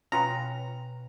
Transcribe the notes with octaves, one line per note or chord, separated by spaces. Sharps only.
B2 C#4 F4 B4 C#5 G5 A#5